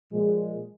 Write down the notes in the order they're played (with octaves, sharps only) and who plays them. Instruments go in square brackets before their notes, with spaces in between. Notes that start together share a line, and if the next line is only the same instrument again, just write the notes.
[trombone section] A#2 F3 G#3